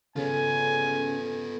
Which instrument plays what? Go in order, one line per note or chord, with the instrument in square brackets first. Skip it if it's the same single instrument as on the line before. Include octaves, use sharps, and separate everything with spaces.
[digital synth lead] C#3 [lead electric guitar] B3 F4 [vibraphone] A4 [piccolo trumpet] G#5